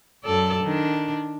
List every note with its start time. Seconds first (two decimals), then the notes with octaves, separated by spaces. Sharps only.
0.24 F#2 A4 D5
0.64 D#3 D4